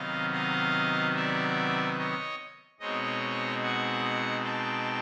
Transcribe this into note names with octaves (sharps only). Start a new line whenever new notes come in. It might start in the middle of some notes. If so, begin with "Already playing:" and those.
Already playing: C3 D#3 F#3 B3 D#5 F5
D#5 F5
D5 E5
C#5 D#5
B2 G#3 C4 D#4 C#5 D#5
F#5 G#5
G5 A5